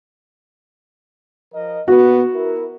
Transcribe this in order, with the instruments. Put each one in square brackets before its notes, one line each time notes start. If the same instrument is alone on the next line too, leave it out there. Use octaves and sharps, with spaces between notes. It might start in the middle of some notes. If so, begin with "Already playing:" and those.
[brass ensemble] F3 A#4 D#5
[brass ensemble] A#2 B3 [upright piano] F#4
[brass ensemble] E4 A#4